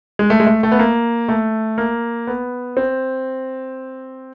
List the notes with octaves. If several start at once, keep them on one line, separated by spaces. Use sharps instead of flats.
G#3
A3
G#3
A3
A3
B3
A#3
A3
A#3
B3
C4